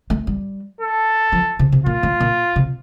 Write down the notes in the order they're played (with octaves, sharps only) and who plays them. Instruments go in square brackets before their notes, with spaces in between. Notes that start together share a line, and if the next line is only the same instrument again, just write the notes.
[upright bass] A3
G3
[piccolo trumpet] A4
[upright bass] F3
C3
C3
[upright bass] A#2 [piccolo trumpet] F4
[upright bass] A2
A#2
C3